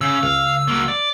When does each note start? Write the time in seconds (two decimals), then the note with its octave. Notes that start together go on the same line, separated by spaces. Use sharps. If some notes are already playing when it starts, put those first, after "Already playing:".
0.01 C#3 E6
0.23 C#2 F5
0.68 F#3 A#3
0.88 D5